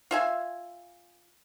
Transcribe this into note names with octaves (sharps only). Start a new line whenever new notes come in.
F4 E5 G#5